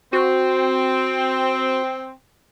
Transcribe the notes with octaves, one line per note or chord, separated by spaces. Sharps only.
C4 F#4